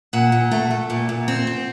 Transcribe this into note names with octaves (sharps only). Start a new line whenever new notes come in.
A#2 F#5
A#2
A3
A3
A#2
A#2
C4
C4